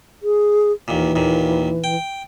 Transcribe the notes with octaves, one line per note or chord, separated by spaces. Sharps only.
G#4
D#2 A#2 E3
D#2 A#2
G5